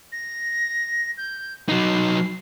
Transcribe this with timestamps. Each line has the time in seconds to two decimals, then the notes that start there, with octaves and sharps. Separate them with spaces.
0.12 A#6
1.17 G6
1.69 F#3 D#4 C7